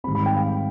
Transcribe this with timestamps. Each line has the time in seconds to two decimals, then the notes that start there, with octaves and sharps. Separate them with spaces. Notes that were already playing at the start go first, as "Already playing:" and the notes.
0.04 G#2 D#3 G3 C4 B5
0.15 B5
0.26 G5
0.36 F5